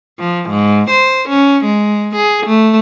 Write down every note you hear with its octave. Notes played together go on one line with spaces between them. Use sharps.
F3
G#2
C5
C#4
G#3
G#4
A3